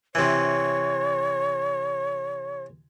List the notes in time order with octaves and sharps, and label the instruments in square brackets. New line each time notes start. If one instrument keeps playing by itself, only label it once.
[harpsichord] C3 E3 [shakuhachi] C#5